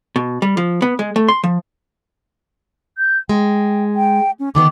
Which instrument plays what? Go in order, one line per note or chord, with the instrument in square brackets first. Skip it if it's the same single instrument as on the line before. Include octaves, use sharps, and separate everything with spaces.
[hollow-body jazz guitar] B2
G3
F3
B3
G#3
A3
C6
F3
[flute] G6
[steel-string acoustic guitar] G#3 [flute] G5
[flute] G5
C#4
[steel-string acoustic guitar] D3 D#3 B3 [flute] D6